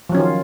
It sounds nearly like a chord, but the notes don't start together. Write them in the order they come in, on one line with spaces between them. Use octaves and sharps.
F3 F#3 C#4 D#3 F4